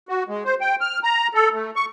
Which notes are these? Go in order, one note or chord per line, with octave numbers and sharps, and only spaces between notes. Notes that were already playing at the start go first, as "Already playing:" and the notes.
F#4
G#3
C5
G5
F6
A#5
A4
A3
C#6